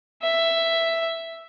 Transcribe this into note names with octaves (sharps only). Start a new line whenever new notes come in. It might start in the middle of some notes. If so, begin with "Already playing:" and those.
E5